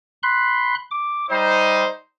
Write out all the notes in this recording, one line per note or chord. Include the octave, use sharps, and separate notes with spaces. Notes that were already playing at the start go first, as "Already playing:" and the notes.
B5 C6 F#6
D6
G3 D#4 C5